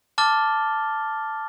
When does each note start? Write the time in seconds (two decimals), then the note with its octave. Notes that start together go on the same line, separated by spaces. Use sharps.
0.18 A5 D6 F6 A6 G7